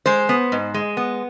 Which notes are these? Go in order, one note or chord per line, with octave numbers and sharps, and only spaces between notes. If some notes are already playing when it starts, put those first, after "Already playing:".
G#3 C5
B3
G#2
G#3
B3